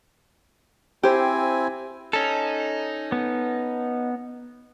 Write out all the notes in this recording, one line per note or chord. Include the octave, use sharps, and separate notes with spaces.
C4 E4 G4 C5 G#5
C#4 D#4 A4
B3